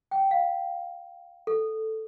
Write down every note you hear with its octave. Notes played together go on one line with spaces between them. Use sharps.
G5
F5
A4